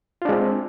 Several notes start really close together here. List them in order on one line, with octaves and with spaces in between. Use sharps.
F4 D4 G#3 C4